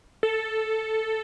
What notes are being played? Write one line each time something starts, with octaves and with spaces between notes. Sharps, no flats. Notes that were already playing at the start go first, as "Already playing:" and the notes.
A4